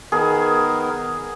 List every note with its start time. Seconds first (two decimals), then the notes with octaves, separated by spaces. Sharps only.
0.12 D#3 B3 G#4 A#4